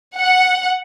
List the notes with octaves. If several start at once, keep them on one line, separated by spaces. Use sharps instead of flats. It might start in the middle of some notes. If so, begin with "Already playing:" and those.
F#5